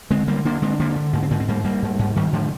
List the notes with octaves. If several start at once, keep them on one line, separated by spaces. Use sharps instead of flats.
D3 G#3 C4
D3 G3 A#3
D3 A#3 D4
D3 G#3 C4
D3 A#3 D4
D3
G#2 A#3
C4
G#2 A#3
C4
G#2 G3 A#3
G#2 G3 A#3
G#2
G#2
G#2 D#3 G3
G#2 D3 F3